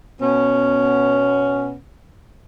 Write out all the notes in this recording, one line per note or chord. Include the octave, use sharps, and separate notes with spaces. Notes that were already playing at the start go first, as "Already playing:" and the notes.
B2 B3 C#4